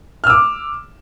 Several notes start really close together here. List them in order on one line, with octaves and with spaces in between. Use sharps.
F6 E6 D6